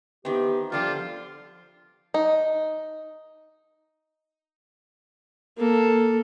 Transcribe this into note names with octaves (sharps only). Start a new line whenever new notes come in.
D#3 E3 B3 C4 G4
D3 F3 G3 D4 F4 G4
D#4
A#3 A4